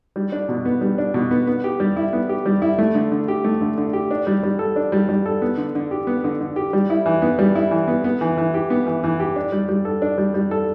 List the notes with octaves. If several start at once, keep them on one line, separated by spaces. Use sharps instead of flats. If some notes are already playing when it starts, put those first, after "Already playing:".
G3
D4
B2
B3
G3
D4
B2
B3
B3
G4
G3
E4
B3
G4
G3
E4
A3
D3
D3
G4
A3
D3
D3
G4
D4
G3
G3
A4
D4
G3
G3
A4
B3
D3
D3
G4
B3
D3
D3
G4
G3
E4
E3
B3
G3
E4
E3
B3
B3
E3
E3
G4
B3
E3
E3
G4
D4
G3
G3
A4
D4
G3
G3
A4